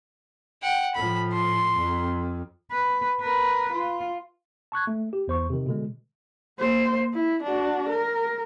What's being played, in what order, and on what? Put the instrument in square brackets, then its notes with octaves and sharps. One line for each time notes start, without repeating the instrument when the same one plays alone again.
[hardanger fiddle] F#5 G5
[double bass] A2 F3 [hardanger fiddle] B5
[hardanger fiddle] C6
[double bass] F2
[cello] B4
A#4 B4
F4
[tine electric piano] A5 C#6 F#6 G#6
A3
G4
E2 C5 C#6
C3 D#3
B2 D3 G#3
[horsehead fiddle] A#3 C5
E4
D4 F#4
A#4